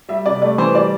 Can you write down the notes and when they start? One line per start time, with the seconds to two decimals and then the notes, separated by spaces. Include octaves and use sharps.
0.09 G3 E5
0.26 C3 D5
0.42 A3 D5
0.58 E3 C5
0.75 G3 D5